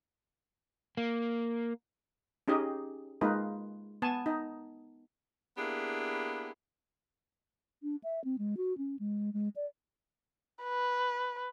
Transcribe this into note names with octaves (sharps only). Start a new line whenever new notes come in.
A#3
C#4 D#4 G4 G#4 D#5
G#3 A#3 D#4 F4 B4
B3 G#5 A5
D#4
A#3 B3 D4 E4 G4 G#4
D4
E5
C4
G#3
F#4
C#4
G#3
G#3
D5
B4